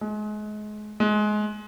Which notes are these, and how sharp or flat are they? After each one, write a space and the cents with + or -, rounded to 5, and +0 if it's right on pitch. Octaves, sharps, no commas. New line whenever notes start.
G#3 +30
G#3 +20